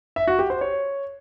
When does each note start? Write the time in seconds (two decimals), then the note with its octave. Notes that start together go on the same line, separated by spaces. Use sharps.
0.16 E5
0.27 F#4
0.39 G4
0.50 C5
0.61 C#5